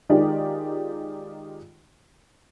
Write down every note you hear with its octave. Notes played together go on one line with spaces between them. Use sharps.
D#3 G#3 D#4 F4 G4 D5